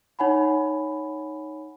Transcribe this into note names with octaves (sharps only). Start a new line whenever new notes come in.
D#4 C#5 F#5 G#5 B5